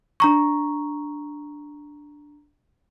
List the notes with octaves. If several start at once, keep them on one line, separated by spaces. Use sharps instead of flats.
D4 A#5 C#6